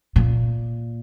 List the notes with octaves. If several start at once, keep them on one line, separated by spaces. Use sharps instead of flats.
A#2